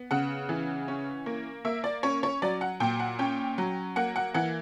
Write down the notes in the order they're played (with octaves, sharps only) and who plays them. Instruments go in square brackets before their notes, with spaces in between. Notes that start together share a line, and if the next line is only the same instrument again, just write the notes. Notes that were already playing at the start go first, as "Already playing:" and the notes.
Already playing: [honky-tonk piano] B3
C#3 F#5
E3
C#4
A#3
A#3 E5
D5
C#4 C#5
C#5
F#3 D5
F#5
A#2 G5
F#5
C#4 G5
F#3
A#3 F#5
F#5
E3 F#5